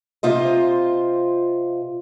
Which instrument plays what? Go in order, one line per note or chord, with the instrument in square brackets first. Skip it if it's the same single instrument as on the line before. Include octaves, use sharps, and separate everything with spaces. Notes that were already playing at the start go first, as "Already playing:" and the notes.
[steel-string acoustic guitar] C3 F4 C5 D#5